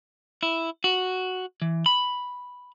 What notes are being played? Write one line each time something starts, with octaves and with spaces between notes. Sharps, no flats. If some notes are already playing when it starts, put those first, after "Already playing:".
E4
F#4
E3
B5